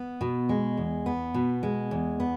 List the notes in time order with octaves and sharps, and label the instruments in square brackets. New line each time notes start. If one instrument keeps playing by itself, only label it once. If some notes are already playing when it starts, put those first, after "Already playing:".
Already playing: [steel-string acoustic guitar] B3
B2
G#3
E2
B3
B2
G#3
E2
B3